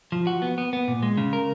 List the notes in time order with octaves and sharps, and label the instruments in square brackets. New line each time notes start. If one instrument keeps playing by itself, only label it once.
[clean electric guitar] F3
F#4
B3
B3
B3
A#2
G#3
C#3
A#4